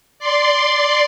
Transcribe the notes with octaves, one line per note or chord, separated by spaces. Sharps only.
D5 C6